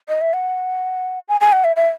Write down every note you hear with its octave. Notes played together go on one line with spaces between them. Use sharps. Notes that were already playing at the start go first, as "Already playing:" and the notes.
D#5
E5
F#5
G#5
G#5
F#5
E5
E5